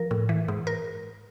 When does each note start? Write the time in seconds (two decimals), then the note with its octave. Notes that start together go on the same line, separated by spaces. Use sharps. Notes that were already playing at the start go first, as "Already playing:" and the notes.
Already playing: F3 A#4
0.11 A2
0.29 E3
0.48 G#2
0.67 A#4